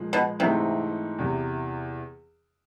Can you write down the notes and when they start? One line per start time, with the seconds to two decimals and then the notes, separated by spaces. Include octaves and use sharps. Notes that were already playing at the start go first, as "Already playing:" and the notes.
Already playing: A#2 F3 G#3
0.13 B2
0.39 G#2 C3 E3 A3 C4 D#4
1.18 E2 C3 E3